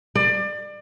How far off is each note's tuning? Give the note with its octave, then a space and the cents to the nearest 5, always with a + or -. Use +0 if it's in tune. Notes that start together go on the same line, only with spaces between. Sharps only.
D5 +30